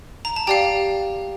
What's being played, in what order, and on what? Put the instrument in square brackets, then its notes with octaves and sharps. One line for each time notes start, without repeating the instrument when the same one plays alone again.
[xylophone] A#5
A5
G4 D5 F5 G5